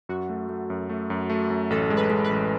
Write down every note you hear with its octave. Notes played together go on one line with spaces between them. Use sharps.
F#2 F#4
A3
A3
F#2
A3
F#2
A3
F#2
A1 A4
G#3
B4
G#3
B4
A1